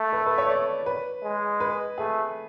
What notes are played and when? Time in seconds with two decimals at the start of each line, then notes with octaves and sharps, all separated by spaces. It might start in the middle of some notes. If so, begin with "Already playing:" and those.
Already playing: A3
0.13 B4
0.26 B4
0.38 C#5
0.49 D5
0.86 B4
1.23 G#3
1.60 B4
1.98 A3 G#4